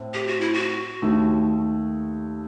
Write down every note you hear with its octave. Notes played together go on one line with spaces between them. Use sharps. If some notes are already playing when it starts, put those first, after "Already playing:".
Already playing: A2 C4
G4
F#4
E4
F#4
D#2 D#3 A3